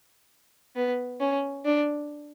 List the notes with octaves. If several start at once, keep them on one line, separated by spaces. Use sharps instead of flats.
B3
C#4
D4